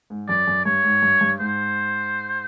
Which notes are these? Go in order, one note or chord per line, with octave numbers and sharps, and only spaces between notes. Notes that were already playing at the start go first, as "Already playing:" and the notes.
G#2
F#2 D5
F#2
G2 C#5
G#2
G2
G2
G#2 C5